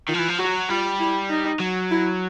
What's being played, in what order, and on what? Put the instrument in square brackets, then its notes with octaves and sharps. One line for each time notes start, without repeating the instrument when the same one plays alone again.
[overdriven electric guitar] D#3 [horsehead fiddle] F4
[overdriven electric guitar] F3
E3
F3
[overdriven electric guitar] F#3 [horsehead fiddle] F#4
[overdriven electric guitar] G3 [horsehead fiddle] F4
[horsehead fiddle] E4
D#4
[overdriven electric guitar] F#3
[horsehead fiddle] E4